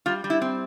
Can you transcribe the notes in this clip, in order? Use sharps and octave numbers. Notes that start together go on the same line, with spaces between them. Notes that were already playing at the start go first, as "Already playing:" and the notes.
G3 F4
G3
E4
C4